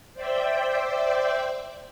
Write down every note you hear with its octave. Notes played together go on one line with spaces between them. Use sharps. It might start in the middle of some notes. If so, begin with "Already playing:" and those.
C5 D5 E5 G5